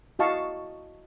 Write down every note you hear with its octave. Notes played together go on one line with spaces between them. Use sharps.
E4 F#4 D#5 F5 A5 C#6